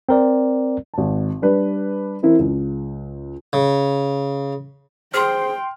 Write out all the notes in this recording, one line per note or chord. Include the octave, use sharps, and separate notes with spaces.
C4 A#4 D5
G#1 A5
G3 D4 B4
E3 C4 E4 A#4
C#2
C#3
G#4 C5 G5 C6 F6